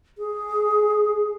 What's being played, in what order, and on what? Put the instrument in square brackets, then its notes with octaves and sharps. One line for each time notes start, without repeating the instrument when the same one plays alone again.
[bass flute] G#4